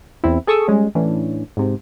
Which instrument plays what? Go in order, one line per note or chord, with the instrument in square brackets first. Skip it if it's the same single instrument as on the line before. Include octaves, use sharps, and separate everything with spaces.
[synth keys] E2 C4 E4
G#4 A4 C#6 D#6 E6
G3 G#3 C#4
A2 E3 C#4 D4
G#2 C3